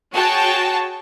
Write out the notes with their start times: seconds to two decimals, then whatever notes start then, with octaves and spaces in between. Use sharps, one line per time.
0.14 F#4 G#4 C#5 G5 A5